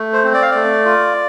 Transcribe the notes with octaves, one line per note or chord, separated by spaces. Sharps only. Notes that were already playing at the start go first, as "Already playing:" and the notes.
Already playing: A3
C5
C4
D5
F5
A3 D5
F4